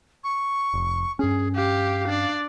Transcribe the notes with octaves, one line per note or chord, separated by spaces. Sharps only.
C#6
F1
G2 C#4 G#4
G4 F5
D4 D5